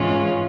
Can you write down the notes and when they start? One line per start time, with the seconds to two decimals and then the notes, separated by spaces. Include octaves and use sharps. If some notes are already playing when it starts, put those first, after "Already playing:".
Already playing: G#2 E3 G#3 C#4 F4